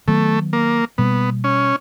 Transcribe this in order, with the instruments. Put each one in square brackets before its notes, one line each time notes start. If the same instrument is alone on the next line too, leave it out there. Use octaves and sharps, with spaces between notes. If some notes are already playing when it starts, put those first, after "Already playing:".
[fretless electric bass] D#3 F#3 B3 [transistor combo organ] A3
[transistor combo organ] A#3
[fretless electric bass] B2 G3 A#3 [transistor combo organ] B3
[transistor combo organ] C#4